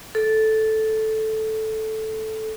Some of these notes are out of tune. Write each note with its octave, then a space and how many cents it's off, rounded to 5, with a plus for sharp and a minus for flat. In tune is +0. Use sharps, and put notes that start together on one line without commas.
A4 -5